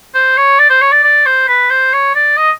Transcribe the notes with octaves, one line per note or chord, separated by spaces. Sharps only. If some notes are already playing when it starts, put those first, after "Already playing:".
C5
C#5
D5
C5
C#5
D5
D5
C5
B4
C5
C#5
D5
D#5